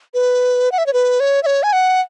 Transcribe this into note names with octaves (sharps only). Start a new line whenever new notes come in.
B4
F#5
E5
C#5
B4
C#5
E5
C#5
G#5
F#5